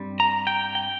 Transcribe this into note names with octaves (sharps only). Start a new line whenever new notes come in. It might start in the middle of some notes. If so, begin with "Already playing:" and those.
Already playing: G2 G3 C4
A#5
G5
G5